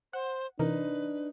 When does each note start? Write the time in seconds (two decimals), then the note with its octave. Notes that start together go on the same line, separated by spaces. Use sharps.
0.13 C5 F#5
0.59 C3 E3 D4 D#4 A#4 B4